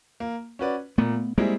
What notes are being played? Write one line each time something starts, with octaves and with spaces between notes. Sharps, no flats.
A#3
C#4 F#4 B4 D5
A#2 A3 B3
G3 G#3 A#3 C4 E4 G#4